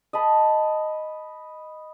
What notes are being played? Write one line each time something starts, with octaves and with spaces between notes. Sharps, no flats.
D#5 A5 B5